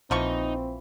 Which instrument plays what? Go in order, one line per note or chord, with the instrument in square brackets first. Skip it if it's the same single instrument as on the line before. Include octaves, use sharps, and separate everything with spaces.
[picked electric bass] A#1 [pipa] E3 F3 C#6 [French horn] C4 [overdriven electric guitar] D#4